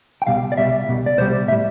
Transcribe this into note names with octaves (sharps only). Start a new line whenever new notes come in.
G5
C2 B2 G3 F5
D5
C2 B2 G3 E5
C2 B2 G3
D5
C2 B2 G3 C5
A2 G3 E5